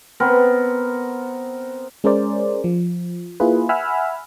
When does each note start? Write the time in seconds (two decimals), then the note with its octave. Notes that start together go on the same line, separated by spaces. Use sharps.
0.20 B3 C4 A#4
2.04 G#3 C#4 G#4 A#4 C5 D5
2.64 F3
3.40 A#3 E4 F4 G#4 B4
3.69 E5 F#5 G#5 B5 E6 F6